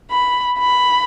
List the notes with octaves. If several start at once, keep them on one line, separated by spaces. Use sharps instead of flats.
B5
B5